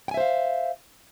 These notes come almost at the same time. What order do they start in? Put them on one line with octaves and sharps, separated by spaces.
G5 G#5 E5 C5 F5